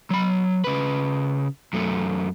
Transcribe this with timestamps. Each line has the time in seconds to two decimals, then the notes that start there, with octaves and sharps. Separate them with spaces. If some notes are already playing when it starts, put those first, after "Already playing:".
0.10 F#3 B5
0.64 C#3 B4
1.73 F#2 A3